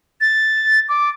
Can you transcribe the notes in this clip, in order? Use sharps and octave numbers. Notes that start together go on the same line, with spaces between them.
A6
D6